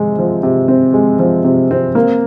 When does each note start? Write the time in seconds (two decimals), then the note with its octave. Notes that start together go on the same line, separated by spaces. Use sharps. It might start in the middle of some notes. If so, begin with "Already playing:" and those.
Already playing: C3 F3 G#3 C4
0.19 F3
0.43 C3
0.68 C4
0.94 G#3
1.19 F3
1.44 C3
1.71 C4
1.95 A#3